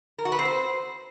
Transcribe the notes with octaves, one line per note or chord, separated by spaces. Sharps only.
A#4
F#4
B4
C4
C5